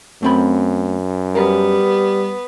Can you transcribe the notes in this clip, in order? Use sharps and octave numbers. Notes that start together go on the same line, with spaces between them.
F#2 A3 C4 B5
G3 B3 A#4